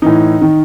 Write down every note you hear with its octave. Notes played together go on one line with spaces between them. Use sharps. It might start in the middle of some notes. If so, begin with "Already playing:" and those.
A2 E3 D#4
D#3